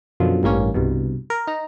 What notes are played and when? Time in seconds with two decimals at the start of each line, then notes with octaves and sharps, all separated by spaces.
0.20 F#2 B2 D3 F3
0.43 A1 G2 A#3 C#4
0.74 C2 G2 B2
1.30 A#4
1.47 D#4 A#5